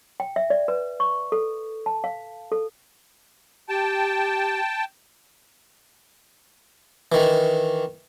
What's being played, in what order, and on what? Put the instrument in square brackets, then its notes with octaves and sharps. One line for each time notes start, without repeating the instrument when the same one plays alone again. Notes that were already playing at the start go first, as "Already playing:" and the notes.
[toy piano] G5
E5
D5
B4
C#6
A4
A5
F5
A4
[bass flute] G4 [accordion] G5 A5
[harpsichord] D#3 E3